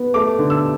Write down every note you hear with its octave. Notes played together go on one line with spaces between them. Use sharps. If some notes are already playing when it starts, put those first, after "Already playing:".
Already playing: B3
A3 D6
D3
E6